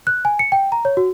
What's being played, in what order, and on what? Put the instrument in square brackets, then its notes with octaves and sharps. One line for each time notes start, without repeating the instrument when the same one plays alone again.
[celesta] F#6
G#5
C#7
G5
A#5
C#5
F#4